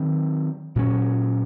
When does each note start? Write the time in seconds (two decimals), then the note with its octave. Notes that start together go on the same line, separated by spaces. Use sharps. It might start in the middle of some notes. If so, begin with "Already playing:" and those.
Already playing: D#3 F#3 C4
0.76 A#2 F#3 C#4